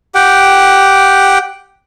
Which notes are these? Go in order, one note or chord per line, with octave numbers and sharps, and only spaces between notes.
G4 F#5 G5